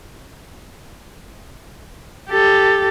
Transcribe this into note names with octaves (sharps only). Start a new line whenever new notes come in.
G4 A4